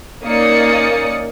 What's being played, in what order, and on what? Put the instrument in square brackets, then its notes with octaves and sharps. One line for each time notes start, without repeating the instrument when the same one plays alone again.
[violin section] A#3 C#4 D#4 D5 D#6 C#7